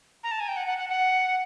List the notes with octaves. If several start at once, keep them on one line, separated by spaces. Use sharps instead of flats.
A#5
A5
G#5
G5
F#5
F#5
F#5
F#5